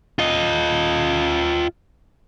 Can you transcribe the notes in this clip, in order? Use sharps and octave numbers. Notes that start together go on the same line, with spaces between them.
F4 D#5